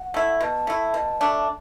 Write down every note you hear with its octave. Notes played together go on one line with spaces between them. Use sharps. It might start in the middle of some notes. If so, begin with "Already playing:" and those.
Already playing: F#5
A3 E4
B2 A5
A3 E4
B2
A3 D4